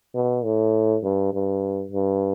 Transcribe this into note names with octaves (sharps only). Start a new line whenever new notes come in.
B2
A2
G2
G2
G2